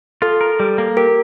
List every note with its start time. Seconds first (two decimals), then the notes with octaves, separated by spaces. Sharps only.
0.22 F4 A4
0.41 A#4
0.60 G3
0.78 A#3
0.97 G4 A#4